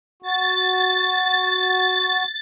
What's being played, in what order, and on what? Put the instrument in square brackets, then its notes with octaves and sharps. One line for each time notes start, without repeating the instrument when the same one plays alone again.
[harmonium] F#4 [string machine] A6